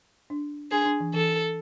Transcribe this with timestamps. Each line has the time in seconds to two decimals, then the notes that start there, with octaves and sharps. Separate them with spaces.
0.30 D4
0.71 D4 G#4
0.85 D4
1.00 E3
1.14 E3 A4